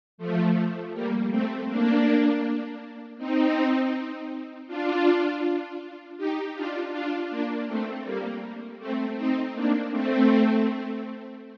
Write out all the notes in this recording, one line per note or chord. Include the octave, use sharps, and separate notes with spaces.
F3 A3
G3 A#3
A3 C4
A#3 D4
C4 D#4
D4 F4
D#4 G4
D4 F4
D4 F4
A#3 D4
A3 C4
G3 A#3
A3 C4
C4 D#4
A#3 D4
A3 C4